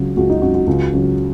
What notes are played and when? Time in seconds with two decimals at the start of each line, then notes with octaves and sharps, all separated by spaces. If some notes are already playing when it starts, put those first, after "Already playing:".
Already playing: C#2 C#3 F#3
0.17 C#2 F#4
0.30 D#4
0.42 C#3 F#3 F#4
0.55 F#4
0.67 C#2
0.93 C#3 F#3